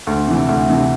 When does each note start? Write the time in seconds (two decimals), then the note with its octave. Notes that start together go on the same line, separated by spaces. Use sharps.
0.07 D2
0.28 C3 E3
0.49 D2
0.69 C3 E3